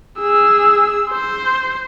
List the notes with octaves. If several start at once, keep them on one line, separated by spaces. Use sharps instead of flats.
G#4 E6
C5